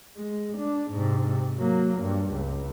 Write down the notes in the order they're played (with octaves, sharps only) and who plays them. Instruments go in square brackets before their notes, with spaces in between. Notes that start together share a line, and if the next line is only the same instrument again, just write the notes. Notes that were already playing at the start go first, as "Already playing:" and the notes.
[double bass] G#3
D4
G#2 C3
F#3 A#3
G2
C#2